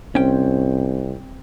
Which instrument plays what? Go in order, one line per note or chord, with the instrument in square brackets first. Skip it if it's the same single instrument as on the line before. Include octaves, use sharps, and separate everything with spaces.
[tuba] C2 [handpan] C4 [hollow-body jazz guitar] C#4 G5